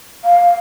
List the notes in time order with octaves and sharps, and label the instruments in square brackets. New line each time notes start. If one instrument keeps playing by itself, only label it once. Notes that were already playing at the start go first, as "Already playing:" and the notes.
[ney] F5